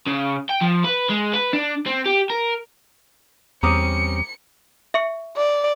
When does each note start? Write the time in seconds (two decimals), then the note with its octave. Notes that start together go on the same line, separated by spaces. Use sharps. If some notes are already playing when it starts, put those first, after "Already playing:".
0.06 C#3
0.50 G5
0.62 F3
0.84 B4
1.09 G#3
1.33 B4
1.53 D4
1.86 C4
2.06 G4
2.30 A#4
3.63 E2 G3 C4 C#4 A#5 D6 D#6 C#7
4.94 E5 C#6 C#7
5.37 D5